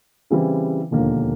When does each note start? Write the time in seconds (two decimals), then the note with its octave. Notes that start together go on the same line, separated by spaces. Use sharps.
0.30 C#3 E3 G3 C4 E4
0.91 E1 D#2 D3 F3 A#3